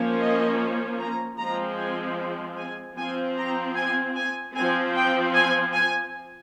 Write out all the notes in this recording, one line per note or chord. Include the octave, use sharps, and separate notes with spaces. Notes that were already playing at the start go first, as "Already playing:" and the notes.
Already playing: F3 A#3 C#4
D#5
A#5
F3 G#3 C4 A#5
G#5
G#5
F3 C4 G#5
A#5
G#5
G#5
F3 C4 G#5
G5
G#5
G#5